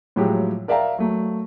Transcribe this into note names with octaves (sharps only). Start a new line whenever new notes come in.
A2 F3 F#3 G#3 G4
A#4 D5 E5 F5 G5 A#5
F#3 A3